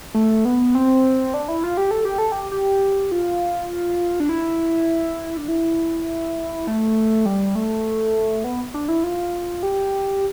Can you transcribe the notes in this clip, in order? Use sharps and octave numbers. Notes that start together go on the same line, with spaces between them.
A3
B3
C4
D4
E4
F4
G4
A4
G4
A4
G4
G4
F4
D4
E4
D4
E4
A3
G3
A3
B3
D4
E4
F4
G4